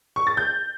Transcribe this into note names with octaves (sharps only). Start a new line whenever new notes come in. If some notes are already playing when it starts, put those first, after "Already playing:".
C#6
A6
G6